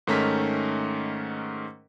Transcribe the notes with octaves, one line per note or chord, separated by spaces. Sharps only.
G#2 D#3 A3 C#4 A#4 B6